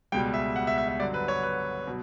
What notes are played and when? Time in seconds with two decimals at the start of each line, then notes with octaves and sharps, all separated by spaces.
0.12 C#2 B2 G3 G5
0.34 E5
0.56 F#5
0.67 E5
0.78 E5
0.89 E5
1.00 G2 D3 F#3 D5
1.14 B4
1.28 C#5
1.43 B4
1.87 B2 F#3